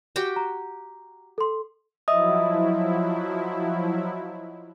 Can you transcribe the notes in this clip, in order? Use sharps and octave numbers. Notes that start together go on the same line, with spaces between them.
F#4 G4 G5
A#5
A4 C6
F3 F#3 E4 D#5 E5 D#6